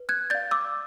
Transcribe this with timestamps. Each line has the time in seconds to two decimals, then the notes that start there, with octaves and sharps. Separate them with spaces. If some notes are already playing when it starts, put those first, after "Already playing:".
Already playing: B4
0.09 F#6 G#6
0.30 D5 F5 G6 A6
0.51 D6 E6